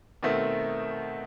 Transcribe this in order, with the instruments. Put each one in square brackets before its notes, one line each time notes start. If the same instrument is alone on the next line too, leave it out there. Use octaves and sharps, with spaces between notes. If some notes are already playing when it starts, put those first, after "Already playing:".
[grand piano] B2 D#3 A3 C4